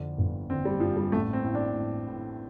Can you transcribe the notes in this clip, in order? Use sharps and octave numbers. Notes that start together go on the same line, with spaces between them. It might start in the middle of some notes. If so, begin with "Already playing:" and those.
Already playing: F2 D3
G1
D3 C4
G3
G2 F3
G3
A1 A3
C4
A2
D4
A2
A2